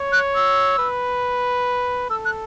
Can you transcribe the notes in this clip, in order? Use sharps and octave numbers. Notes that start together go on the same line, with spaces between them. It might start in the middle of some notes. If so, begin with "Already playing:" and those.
Already playing: C#5
F#6
E6
B4
A4 E6
F#6